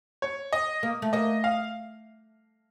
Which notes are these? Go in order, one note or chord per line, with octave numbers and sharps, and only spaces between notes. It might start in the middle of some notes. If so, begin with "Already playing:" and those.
C#5
D#5
A#3
A3
A#3 D#5
F5